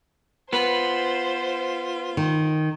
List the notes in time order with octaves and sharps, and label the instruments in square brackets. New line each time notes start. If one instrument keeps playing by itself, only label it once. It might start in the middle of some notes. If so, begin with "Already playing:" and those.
[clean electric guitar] B3 B4 [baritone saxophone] F4 [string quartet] C5
[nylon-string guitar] D#3